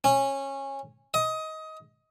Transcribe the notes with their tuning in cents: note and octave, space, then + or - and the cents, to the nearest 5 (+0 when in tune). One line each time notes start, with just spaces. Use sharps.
C#4 -20
D#5 +20